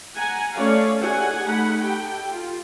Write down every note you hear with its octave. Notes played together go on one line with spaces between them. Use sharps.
F#5 G#5 A#5
A3 C#4 A4 C#5 D5 F5
D#4 G4 G#4 F#5 G#5
A3 D#4 F#5 B5
G4 A4 G5
F4